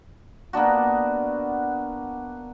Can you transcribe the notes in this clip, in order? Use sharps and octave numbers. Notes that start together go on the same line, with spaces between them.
A#3 B3 D4 F#4